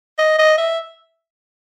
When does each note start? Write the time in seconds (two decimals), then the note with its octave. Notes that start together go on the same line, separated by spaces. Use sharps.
0.18 D#5
0.39 D#5
0.57 E5